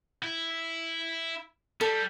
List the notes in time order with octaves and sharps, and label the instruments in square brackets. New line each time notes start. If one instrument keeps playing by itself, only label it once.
[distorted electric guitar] E4
[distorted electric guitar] G3 [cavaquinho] A4